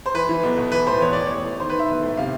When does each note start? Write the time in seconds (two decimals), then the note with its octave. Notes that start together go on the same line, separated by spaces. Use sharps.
0.06 C5
0.14 E3 B4
0.29 E3
0.43 B1
0.58 B2
0.72 E3 B4
0.87 A2 C5
1.01 E2 C#5
1.13 E3 D5
1.26 A1 C#5
1.45 A2
1.59 D#3 C5
1.70 B4
1.74 D#3 E5
1.88 B1
2.02 A2
2.17 C3 F5